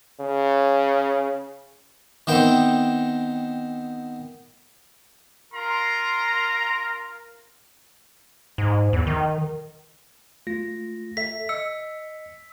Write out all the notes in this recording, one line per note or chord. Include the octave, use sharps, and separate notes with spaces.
C#3
D#3 B3 C4 E5 G5
F4 A#4 A#5 C6
G#2
E2
D#3
A3 F4 A#6
A4 E5 B6
D#5 E6 C#7